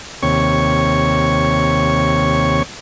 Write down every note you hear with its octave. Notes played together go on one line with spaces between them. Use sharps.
D#2 C3 C#5 C#6